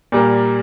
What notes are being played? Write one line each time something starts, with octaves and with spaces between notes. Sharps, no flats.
A#2 G3 A#3